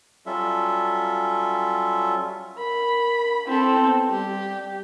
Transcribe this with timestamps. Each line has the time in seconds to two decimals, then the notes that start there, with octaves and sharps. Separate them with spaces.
0.26 F#3 G3 C#4 F4 A4 E5
2.58 A#4 B5
3.48 C4 E4 A4
3.77 B3
4.10 G3 G4